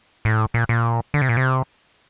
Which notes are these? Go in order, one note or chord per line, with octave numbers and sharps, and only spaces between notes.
A2
A#2
A#2
D3
C3
A#2
C3